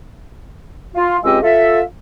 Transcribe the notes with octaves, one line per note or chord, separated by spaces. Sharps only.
F4
C#2 G#3 C4 G4 D#5 E6
F4 A4 E5